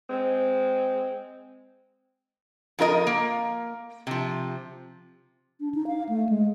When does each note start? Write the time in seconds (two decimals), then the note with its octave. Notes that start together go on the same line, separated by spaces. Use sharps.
0.10 G#3 C4
2.79 F2 F4 A#4 D#5
3.07 A#3
4.07 C3 F3
5.60 D4
5.75 D#4
5.87 F5
6.09 A3
6.29 G#3